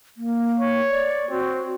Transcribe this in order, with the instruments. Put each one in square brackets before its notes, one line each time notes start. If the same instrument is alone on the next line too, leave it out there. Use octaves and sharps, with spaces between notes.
[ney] A#3
[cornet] C#5
[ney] D5
[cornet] C4 [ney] F#4